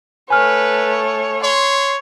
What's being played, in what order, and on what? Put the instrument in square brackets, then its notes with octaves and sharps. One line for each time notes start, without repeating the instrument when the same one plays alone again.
[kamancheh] A3 C#5 [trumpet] B4 [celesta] G#5 F6
[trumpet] C#5 [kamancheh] C6